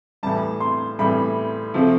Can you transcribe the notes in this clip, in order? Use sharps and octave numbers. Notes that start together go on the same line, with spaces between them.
A2 E3 G3 A5
C6
A2 E3 G3 B5
C3 F3 A3